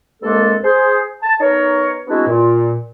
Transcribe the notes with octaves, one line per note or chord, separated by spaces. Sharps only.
C2 G2 G#3 A#3 A4
G#4 C5
A5
B3 D#4 A#4 C#5
G#3 B3 C4 D4 E4 F#4
A#2